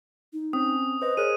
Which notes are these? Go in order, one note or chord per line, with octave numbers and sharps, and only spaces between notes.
D#4
C4 C#4 D#6
B4 C5 D#5
G#4 A#4 C#5 F#6 D#7